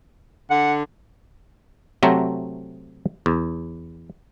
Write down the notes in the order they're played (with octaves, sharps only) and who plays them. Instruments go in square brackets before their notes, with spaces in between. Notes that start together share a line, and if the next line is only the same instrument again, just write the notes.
[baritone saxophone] D3 [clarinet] F#5
[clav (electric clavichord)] C3 F#3 A3 C4 A#5
E2